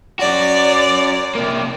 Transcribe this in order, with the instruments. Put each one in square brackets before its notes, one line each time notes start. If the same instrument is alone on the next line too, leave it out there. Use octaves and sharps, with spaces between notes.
[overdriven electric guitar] C#4 F#4 [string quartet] D5
[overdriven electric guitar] C3 A#3